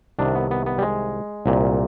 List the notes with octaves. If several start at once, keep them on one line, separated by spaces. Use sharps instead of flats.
C2 C3 D#3 D4
B3
B3
B3
G3
G#3
C2 A#2